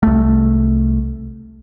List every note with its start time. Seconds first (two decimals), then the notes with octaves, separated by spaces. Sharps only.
0.03 C2 A3